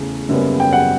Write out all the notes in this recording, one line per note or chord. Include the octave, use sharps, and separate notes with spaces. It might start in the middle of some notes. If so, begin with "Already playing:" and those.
Already playing: E2 C#3 E3 A3
F#1 F#2 C#3 G3 B3
G5
F#5